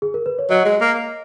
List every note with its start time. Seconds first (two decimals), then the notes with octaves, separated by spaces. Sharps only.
0.02 G#4
0.14 A#4
0.26 B4
0.39 C#5
0.50 F#3 D#5
0.65 G#3
0.81 A#3